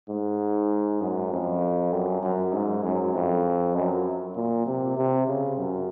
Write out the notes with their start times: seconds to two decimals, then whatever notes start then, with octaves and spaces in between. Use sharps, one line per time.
0.09 G#2
1.01 F#2
1.31 F2
1.92 F#2
2.22 F#2
2.53 G#2
2.83 F#2
3.15 F2
3.75 F#2
4.36 A#2
4.66 C3
4.97 C3
5.28 C#3
5.57 F#2